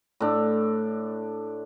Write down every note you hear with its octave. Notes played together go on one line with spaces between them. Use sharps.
A2 D4